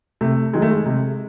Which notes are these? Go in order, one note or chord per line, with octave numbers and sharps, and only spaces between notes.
C3 A3
D#3 F#3 G#3
A3
G#3
C3